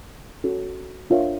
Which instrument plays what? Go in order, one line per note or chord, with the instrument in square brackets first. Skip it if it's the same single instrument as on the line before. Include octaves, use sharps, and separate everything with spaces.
[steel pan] C#4 F#4 A4
D4 F4 A#4 C#5 E5